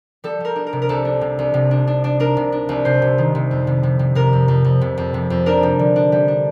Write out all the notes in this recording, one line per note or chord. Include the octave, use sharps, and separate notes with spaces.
G3 A4
G3 A#4
D4
A#4
C3
A#4
C2 A4
D4
C3
C2
C3
D4
D4
D4
D4 A#4
C3
D4
C2
C3 C5
C3
D#3
C3
F2
C3
C3
C3
C3 A#4
F2
F2
F2
C3
F2
C3
F2
D4 A#4
G3
D3
D4
G3
D4